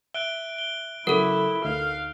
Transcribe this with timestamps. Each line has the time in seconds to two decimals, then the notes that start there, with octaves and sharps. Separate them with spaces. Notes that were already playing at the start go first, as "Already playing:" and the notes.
0.14 E5 F#6 D7 G7
0.58 G7
1.07 C#3 F#3 E4 A4 A#4
1.65 D2 D#4 F5